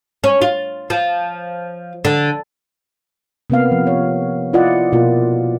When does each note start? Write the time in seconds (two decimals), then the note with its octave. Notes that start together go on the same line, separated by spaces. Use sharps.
0.24 C#4
0.42 F4
0.90 F3
2.05 D3
3.50 C3 A#3 B3 F5
3.71 F3
3.87 C#5
4.53 E4 F4 D5 D#5 F#5
4.93 B2 A#3 F4